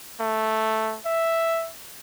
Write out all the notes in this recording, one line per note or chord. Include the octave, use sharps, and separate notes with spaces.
A3
E5